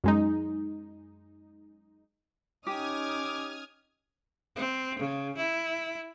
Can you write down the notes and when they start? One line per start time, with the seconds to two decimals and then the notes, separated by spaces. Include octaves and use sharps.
0.04 F#2 G#3 D#4
2.67 C#4 D#4 G4 D6 D#6 F6 G#6
4.58 C4
5.00 C#3
5.39 E4